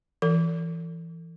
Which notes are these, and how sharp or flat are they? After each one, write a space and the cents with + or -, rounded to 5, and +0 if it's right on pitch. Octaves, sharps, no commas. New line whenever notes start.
E3 +10 A4 +35